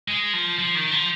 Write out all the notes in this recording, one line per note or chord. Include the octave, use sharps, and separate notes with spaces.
G#3
F3
F3
D#3
F3